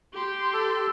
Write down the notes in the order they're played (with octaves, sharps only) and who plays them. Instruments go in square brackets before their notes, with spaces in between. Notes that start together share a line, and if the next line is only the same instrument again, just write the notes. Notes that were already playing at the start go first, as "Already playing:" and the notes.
[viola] G4 C6
[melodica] A4